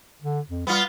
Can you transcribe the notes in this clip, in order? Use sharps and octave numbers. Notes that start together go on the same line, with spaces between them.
D3
F2
G3 B3 F4